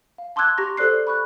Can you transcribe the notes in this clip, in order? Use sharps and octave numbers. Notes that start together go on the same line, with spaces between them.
F5
A5 C6 D6 E6 F#6 G#6
G4 A#5 C6 C#6 A#6
G4 A4 C5 D5 F#6 C7
B5 C#6 F#6